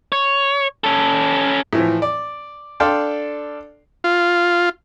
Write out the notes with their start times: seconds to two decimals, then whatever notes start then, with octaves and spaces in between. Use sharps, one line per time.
0.12 C#5
0.84 C#4 A4
1.73 A2 E3 F3
2.02 D5
2.80 D4 A4 D5 F5 G5 C6
4.04 F4